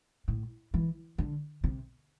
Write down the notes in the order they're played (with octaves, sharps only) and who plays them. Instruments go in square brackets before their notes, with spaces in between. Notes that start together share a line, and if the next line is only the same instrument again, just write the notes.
[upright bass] A2
E3
D3
C3